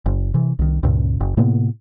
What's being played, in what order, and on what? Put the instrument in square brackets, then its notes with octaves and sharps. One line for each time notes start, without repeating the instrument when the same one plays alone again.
[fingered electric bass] F#1
C3 E3
C2 D#3
C#2 G2 A#2 C#3
F#1
A2 C3 A#3 B3